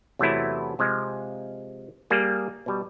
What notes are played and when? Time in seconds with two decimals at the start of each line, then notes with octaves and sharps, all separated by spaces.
0.19 E2 C3 F#3 A3 B3 E4
0.79 C3 F3 G#3
2.10 G3 A#3 G#4
2.66 B2 G3